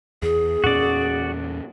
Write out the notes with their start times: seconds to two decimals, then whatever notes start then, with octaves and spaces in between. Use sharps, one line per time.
0.22 E2 G#4
0.64 E2 A#2 C#4 F#4 D5